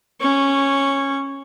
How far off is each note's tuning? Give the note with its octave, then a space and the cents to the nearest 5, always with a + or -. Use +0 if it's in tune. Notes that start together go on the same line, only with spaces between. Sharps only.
C#4 -10 C#6 +0